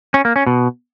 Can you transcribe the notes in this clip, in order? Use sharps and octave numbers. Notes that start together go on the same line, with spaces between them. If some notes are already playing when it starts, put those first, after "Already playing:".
C#4
A#3
C#4
B2